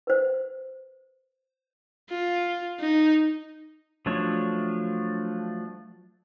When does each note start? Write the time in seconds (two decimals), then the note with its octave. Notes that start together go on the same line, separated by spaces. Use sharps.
0.07 B4 C5
2.10 F4
2.80 D#4
4.06 F3 F#3 A3 D4 C#5